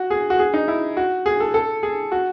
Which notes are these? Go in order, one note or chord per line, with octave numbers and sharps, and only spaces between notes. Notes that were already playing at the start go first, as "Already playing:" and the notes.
Already playing: F#4
G#4
F#4
G#4
D#4
E4
F#4
G#4
A4
A4
G#4
F#4